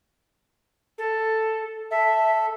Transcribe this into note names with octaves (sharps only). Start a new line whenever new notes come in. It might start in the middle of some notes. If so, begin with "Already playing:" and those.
A4
A4 E5